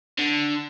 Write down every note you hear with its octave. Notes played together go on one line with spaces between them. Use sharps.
D3